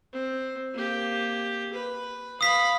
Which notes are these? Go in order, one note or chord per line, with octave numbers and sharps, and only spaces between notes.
C4
A#3 G4
B4
F5 B5 D#6 B6